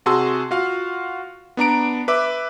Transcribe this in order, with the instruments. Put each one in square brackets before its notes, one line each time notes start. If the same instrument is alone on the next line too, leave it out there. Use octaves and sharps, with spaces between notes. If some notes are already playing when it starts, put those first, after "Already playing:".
[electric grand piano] C3 F#4 G#4 A5 C6 E6
F4 F#4 F5
B3 D4 A#5 D7
B4 E5 D6